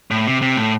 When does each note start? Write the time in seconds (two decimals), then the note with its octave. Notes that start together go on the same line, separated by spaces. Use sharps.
0.11 A2
0.27 C3
0.42 C3
0.57 A2